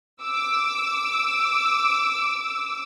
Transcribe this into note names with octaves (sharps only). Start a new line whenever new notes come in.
D6 E6